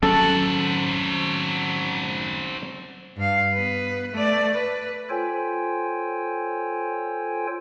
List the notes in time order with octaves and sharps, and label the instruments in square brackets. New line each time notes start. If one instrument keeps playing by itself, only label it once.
[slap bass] F#3 C#4 [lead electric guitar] C4 F#4 [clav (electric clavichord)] A4
[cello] G2 F5
B3 B4
A3 D5
B4
[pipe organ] F4 A4 C5 C#5 G5 G#5